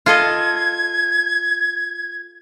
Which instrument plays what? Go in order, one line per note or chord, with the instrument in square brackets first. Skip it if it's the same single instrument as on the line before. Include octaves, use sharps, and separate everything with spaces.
[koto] F4 A4 D#5 [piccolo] G#6